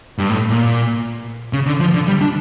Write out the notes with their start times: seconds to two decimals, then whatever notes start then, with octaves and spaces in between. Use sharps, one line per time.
0.18 G2
0.30 A2
0.50 A#2
1.53 C#3
1.66 D3
1.80 F3
1.94 D3
2.08 G3
2.21 D4